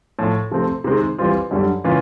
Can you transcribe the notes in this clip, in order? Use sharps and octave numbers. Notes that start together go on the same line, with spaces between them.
A2 F3 A3
C3 F3 A3 C4
C3 D#3 G#3 C4
E3 G3 C4 F4
F#2 D3 G3
C#3 E3 G#3 C#4 F4